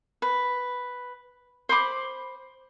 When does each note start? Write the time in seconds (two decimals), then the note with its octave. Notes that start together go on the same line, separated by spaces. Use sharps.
0.22 B4
1.69 C5 B5 D6